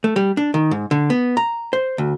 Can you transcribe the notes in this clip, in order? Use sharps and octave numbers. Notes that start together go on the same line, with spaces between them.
A3
G3
D4
D#3
G#2
D3
B3
A#5
C5
D2